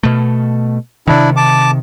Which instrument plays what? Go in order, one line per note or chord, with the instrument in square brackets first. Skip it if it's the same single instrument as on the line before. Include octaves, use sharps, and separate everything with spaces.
[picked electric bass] B2 A3
[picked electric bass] C3 D#3 [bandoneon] D4 E4
[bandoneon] A5 D6